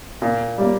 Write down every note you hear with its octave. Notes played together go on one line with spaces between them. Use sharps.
A#2
G3 A#3